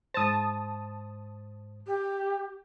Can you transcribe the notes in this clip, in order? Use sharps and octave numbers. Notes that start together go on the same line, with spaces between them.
G#2 C5 A5 D#6
G4